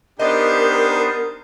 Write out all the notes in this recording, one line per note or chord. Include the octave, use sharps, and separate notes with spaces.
B3 D4 D#4 G4 A#4 C5 D#5